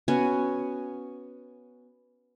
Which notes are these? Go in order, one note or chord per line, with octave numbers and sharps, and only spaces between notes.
B3 C#4 F#4 G#5